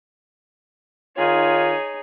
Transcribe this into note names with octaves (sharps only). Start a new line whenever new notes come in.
D#3 D#4 F4 G#4 C#5